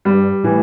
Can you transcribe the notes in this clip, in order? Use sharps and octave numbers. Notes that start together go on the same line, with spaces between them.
G2 G3
A2 E3